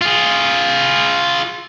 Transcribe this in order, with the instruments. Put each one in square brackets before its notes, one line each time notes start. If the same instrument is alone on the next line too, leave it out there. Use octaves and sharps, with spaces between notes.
[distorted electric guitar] F4 G#4